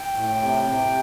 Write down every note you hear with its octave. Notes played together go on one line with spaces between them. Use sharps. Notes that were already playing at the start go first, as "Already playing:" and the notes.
Already playing: G5
A2
C3
C3